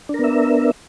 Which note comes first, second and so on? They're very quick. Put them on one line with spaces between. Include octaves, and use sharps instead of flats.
D4 A#4 B3 E5